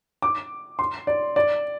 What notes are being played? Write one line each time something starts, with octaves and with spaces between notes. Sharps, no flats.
D6
C6
D5
D5